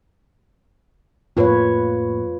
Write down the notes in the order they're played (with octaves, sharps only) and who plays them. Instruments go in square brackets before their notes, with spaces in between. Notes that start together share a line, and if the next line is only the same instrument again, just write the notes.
[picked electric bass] F2 A2 A#3 [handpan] F4 B4 C#5